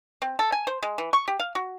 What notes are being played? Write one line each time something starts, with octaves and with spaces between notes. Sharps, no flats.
C4
A4
G#5
C5
G#3
E3
C#6
G4
F5
F#4